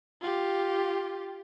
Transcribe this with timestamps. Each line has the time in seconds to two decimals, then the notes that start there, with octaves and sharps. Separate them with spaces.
0.21 F4 G4